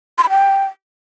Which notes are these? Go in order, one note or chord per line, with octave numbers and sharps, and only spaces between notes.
C6
B5
G5